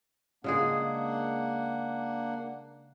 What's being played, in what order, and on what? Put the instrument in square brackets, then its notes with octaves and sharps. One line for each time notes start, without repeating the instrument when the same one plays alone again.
[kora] C#3 G#3 G#4 [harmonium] A#3 D4 F#5